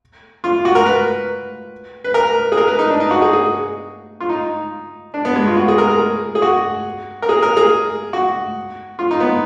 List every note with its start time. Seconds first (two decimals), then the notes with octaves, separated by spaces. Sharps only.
0.44 F4
0.65 F#4
0.75 A#4
0.86 B4
2.04 B4
2.14 A#4
2.52 G#4
2.57 A#4
2.68 B4
2.79 D#4
2.90 D4
3.00 D#4
3.11 F#4
3.22 G#4
3.33 G#4
4.20 F4
4.29 D#4
5.14 D4
5.25 B3
5.35 G#3
5.47 F4
5.57 F#4
5.68 G#4
5.78 A#4
5.90 G#4
6.35 G#4
6.42 F#4
7.22 A#4
7.29 G#4
7.42 A#4
7.57 G#4
8.13 F#4
8.99 F4
9.11 D#4
9.20 B3